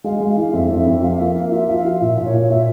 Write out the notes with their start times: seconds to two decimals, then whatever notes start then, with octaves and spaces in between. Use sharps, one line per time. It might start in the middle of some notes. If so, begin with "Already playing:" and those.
0.04 G#3 F5
0.20 G#3
0.29 F5
0.37 E3
0.53 F2 E5
0.70 F2
0.77 E5
0.86 F2
1.02 F3 F5
1.19 A#3 E5
1.35 A#3 F5
1.52 F4 E5
1.68 F3
1.77 F5
1.85 F4
2.01 A#2 E5
2.17 A#2
2.25 C#5
2.34 A#2
2.50 A#2 E5